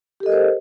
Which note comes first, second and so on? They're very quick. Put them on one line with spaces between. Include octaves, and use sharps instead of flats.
G4 A4 D#5 A#4 C5